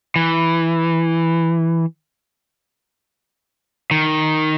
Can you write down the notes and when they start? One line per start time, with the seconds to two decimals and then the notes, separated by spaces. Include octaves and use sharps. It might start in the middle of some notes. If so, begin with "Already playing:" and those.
0.16 E3
3.91 D#3